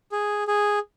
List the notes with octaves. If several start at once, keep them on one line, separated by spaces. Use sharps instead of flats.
G#4
G#4